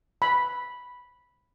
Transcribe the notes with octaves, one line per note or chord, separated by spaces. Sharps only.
B5